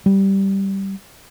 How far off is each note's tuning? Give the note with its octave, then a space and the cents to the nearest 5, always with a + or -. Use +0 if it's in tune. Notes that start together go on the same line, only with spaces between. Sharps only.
G3 -10